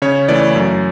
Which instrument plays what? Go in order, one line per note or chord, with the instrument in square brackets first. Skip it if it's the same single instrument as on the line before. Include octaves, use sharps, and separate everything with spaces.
[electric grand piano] C#3 C#5
E3 A3 D5
F#2